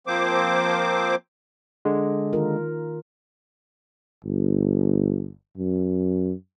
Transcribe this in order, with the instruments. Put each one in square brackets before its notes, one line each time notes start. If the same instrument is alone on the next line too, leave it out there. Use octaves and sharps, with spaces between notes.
[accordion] F3 A#3 C4 C5 D6
[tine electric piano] D3 G#3
[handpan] D#3 F4 A#4
[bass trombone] G1
F#2